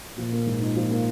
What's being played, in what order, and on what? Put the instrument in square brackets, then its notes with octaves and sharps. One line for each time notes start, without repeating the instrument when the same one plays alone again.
[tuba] A#2 [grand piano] F3
[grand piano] A#3
G#2
D#4
F3
A#3